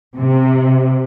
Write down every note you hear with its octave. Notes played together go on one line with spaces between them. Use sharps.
C3